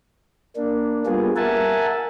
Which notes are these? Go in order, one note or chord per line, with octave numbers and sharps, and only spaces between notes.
A#3 D4
G3 A#3 B3 F4 G#4
A#4 E5 F#5 G#5 A5